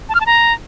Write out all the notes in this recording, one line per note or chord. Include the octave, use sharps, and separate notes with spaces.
A5
F6
A5
A#5